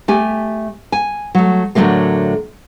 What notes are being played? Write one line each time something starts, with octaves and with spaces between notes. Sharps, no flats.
A3 G4 G#5
G#5
F#3 A3
A2 D3 D#3 F#3 A3 A#3